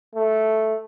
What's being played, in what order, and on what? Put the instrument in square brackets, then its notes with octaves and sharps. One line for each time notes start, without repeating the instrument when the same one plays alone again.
[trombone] A3